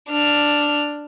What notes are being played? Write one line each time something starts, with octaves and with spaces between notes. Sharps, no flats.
D4 F6